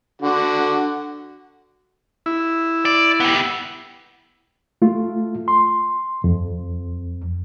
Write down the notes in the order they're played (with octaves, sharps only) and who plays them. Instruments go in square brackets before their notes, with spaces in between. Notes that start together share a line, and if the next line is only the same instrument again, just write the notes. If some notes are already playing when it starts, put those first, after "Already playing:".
[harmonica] D3 F#4
[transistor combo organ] E4
[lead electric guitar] D5
B3 G4
[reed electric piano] A3 F4
C6
F2